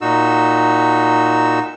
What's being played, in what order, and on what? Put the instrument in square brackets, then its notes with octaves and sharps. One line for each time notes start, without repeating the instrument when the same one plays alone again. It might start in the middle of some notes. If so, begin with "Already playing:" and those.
[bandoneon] A#2 D#4 F#4 E6